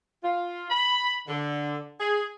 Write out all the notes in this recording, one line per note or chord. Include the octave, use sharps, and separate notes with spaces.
F4
B5
D3
G#4